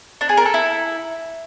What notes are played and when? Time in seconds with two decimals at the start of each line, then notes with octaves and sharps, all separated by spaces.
0.21 D4
0.29 G#4
0.37 A#4
0.46 A4
0.54 E4